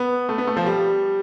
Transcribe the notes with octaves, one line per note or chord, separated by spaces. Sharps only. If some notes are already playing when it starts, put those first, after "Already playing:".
Already playing: B3
A3
B3
A3
F3
G3